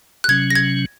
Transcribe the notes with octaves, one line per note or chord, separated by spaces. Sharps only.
F#6
C3 F#3 C#4 G#6
A#6
G#6